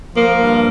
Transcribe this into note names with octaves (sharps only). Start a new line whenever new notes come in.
F3 A#3
G2